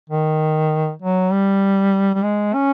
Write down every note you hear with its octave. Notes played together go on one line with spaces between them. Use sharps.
D#3
F#3
G3
G3
G#3
C#4